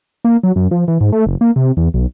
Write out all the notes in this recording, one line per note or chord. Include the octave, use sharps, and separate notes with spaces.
A#3
F#3
F#2
F3
E3
G#2
A3
F#1
A#3
C3
E2
B1